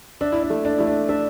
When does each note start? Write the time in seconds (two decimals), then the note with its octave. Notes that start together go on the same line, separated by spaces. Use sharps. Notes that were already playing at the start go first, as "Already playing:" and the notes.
0.21 D4 E5
0.32 E4
0.43 D4
0.50 A3
0.65 D4
0.78 A3 E4
0.87 D4
1.08 D4 E5